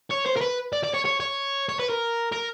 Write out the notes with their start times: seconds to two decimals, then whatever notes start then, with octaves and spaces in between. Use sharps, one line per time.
0.10 C#5
0.26 C5
0.36 A#4
0.41 B4
0.73 D5
0.84 D5
0.94 C#5
1.05 C#5
1.20 C#5
1.69 C#5
1.79 B4
1.90 A#4
2.32 A#4